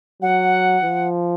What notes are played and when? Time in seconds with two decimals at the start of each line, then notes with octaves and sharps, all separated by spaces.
0.22 F#3 F#5
0.84 F3